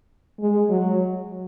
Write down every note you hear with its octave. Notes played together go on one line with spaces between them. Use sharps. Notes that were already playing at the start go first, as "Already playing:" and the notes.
G#3
F#3